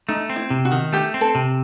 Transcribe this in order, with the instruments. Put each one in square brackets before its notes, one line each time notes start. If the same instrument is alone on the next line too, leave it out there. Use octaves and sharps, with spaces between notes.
[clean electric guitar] A3 [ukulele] D#4
[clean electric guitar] C4
[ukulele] E4
[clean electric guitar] C3
[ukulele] F#4
[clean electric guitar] D#3
[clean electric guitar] A3 [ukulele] G4
[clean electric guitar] C4
[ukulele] A4
[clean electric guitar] C3